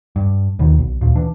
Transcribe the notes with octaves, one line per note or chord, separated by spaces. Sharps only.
G2
D#2 B2 D#3
B1
D2 A#2
E3 D4